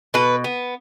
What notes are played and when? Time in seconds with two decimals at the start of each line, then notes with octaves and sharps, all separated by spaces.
0.14 B2 B4
0.44 B3